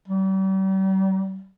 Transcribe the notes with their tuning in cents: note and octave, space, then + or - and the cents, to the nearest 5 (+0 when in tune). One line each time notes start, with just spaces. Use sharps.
G3 -40